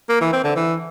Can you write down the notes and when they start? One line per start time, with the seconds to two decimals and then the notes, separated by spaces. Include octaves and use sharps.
0.09 A#3
0.21 E3
0.33 C4
0.44 D3
0.56 E3